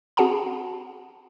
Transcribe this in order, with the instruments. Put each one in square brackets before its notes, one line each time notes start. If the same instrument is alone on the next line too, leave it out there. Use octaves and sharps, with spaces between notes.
[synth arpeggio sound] C4 F#4 G#4 F#5 A5 A#5